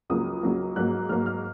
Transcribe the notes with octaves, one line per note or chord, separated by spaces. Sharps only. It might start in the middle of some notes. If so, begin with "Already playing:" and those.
C#2 C#3 F#3 A#3 D#6
C#2 C#3 F#3 A#3
G#2 F#3 A#3 F#6
G#2 F#3 A#3 F6
F6